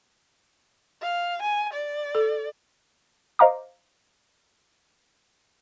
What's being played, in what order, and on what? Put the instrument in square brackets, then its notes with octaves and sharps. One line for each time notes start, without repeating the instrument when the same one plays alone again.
[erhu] F5
G#5
D5
[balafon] A4
[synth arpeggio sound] C5 D#5 F5 A#5 D6